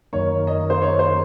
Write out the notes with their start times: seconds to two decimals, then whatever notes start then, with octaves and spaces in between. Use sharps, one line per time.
0.13 F#2 D#3 A#3 C#5
0.47 D#5
0.70 C5
0.82 C#5
0.99 C5